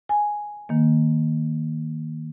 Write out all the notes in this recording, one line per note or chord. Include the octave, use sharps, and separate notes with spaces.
G#5
D#3 A#3